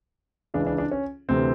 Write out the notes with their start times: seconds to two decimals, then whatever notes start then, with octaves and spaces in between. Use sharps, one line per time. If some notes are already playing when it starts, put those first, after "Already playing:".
0.54 C#2 C#3 E3 D4
0.67 D4
0.78 D4
0.91 C#4
1.29 D2 C3 E3 C4